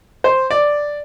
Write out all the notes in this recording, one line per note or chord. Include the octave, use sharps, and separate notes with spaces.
C5
D5